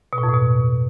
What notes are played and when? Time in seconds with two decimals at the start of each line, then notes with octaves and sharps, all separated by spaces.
0.13 B2
0.18 A2
0.23 F2
0.29 A2
0.34 B2